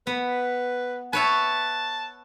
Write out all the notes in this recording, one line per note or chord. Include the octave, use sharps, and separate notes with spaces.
B3 B4
B4 C#5 E5 A5